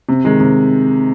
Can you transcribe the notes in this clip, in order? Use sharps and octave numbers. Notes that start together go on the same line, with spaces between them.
C3
D#3 G#3
C3